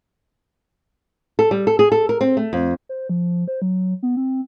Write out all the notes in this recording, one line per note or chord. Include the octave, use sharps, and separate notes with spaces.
A4
G3
A4
G#4
A4
A#4
C4
A3
F2
C5
F3
C5
F#3
B3
C4